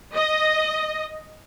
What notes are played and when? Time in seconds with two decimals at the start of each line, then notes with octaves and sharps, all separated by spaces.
0.16 D#5